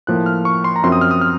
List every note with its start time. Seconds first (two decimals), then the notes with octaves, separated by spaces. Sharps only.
0.07 A2 F3 A#3 F#6
0.26 F6
0.45 C#6
0.64 C6
0.76 A#5
0.83 F#2 F3 C4 C6
0.92 D#6
1.01 F6
1.11 D#6
1.21 F6